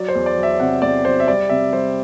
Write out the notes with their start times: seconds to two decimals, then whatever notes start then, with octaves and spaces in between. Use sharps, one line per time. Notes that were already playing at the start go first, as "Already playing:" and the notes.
Already playing: F#3 D5
0.08 C5
0.15 E2
0.26 D5
0.37 F#3
0.43 E5
0.60 C3 F#5
0.82 E2 D5
1.05 F#3 C5
1.20 E5
1.28 G3 D5
1.50 C3 E5
1.73 G3 C5